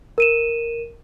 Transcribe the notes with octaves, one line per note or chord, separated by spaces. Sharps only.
A#4 D#7 E7